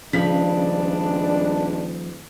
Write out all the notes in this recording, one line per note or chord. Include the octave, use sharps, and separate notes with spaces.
D#1 G2 C#3 F3 G#3 D4 B6